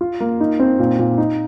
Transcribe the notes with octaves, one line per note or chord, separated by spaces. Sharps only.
F4
A#3
D#4
C4
A#2
A#2
D#4